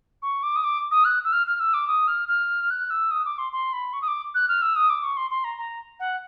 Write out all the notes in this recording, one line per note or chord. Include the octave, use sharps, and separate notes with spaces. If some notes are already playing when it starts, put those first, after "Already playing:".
C#6
D6
D#6
D6
D#6
F#6
E6
F6
F6
E6
D6
D#6
F6
F6
F#6
E6
D#6
D6
C6
C6
B5
C#6
D#6
D6
F#6
F6
E6
D#6
D6
C#6
C6
C6
A#5
A#5
F#5